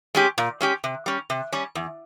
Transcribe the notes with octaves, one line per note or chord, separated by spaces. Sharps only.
G#3 C#4 G4
A#2
G#3 C#4 G4
C3
G3 C#4
C3
G3 C#4
E2